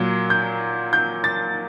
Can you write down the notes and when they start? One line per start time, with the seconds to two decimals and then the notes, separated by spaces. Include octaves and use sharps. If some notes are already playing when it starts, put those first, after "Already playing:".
Already playing: A#2 F#3
0.30 G6
0.93 G6
1.24 A6